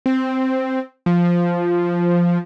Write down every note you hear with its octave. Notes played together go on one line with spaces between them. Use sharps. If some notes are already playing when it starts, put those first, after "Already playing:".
C4
F3